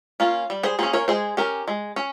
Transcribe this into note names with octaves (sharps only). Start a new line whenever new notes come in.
A#3 C#4 F4
G3
G#4 C5
A#3 C#4 G#4 C5
A#4 C#5
G#3 G#4 C5
C#4 G4 A#4
G#3
C#4